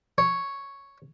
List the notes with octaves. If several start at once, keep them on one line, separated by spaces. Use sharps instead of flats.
C#5